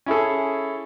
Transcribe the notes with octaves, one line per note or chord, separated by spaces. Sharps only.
C#4 E4 G#4 A4